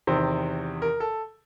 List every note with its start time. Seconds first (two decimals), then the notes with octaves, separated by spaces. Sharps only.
0.07 E2 C3 D#3 C5
0.82 A#4
1.00 A4